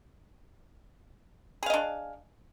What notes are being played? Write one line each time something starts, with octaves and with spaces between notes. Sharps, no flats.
D4 G#4 D#5 F5